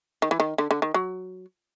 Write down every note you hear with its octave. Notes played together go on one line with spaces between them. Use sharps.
D#3
E3
D#3
D3
D3
D#3
F#3